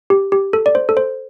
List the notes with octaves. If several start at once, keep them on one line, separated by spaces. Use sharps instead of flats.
G4
G4
A4
D5
C5
A4
C5